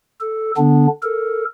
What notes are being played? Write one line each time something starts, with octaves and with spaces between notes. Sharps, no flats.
A4
D3 B3 D4
A4 A#4